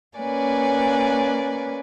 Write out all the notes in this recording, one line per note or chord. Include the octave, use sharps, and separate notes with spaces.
A#3 C#4 B4 D5 G#5